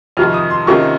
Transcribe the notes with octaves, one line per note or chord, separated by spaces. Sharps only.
F2 C3 D#3 F6
D#6
C6
C3 D#3 A#3 C#4 F4 C#6